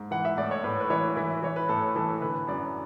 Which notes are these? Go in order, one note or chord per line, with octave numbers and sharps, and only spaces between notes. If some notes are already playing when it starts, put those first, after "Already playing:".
Already playing: G#2
E3 F#5
E5
A2 D5
C#5
A2 B4
B4
E3 C#5
E3 E4
E3 C#5
B4
A2 A4
E3 A4
D3 B4
F#2 D5